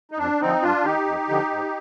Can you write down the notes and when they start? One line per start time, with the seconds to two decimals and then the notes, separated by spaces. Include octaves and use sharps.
0.11 D#4
0.18 F2 D4
0.41 D3 F3 C4 D#4
0.62 G2 D4 F4
0.84 D#3 D#4 G4
1.06 F2
1.29 D3 F3
1.51 G#2